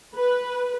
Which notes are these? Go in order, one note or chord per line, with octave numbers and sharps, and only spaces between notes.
B4